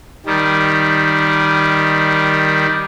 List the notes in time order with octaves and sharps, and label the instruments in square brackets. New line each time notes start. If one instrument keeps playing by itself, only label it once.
[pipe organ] D#3 G3